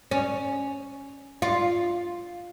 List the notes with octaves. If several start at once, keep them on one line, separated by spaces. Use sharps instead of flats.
C#4
F4